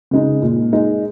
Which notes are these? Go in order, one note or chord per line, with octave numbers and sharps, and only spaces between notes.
C#3 G#3 D#4
A#2
G#3 D#4